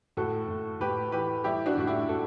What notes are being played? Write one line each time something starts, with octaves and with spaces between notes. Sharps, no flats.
A2 F#4 A4
A2
A2 G4 B4
E3 G4 B4
G3 E4 G4
D4 F#4
A2 F#4
E4 G4
A2 F#4 A4